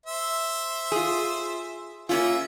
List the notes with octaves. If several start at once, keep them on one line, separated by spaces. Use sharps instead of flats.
C5 E5
F4 G#4
A#3 C#4 F4 G#4 E5